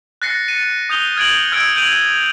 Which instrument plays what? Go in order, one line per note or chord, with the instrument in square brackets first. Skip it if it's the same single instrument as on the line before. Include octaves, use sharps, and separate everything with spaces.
[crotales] F#6 A6 A#6 C7 C#7
A6 C#7 D#7
D#6 G6 F7 G7
F6 G#6 A6 D7 F#7
E6 F6 G6 G#6 C#7 D7
G6 D7 D#7 F7 F#7